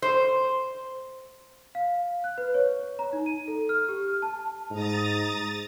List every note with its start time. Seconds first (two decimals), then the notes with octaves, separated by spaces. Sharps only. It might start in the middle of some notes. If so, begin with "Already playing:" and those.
0.02 C5
1.75 F5
2.24 F#6
2.38 B4
2.54 C#5
2.99 A#5
3.13 D#4
3.26 D#7
3.48 A4
3.69 F6
3.89 G4
4.08 F6
4.22 A5
4.70 G#2 A#5 D#6 A6
5.32 G#2